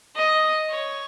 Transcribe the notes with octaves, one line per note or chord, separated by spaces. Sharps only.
D#5
C#5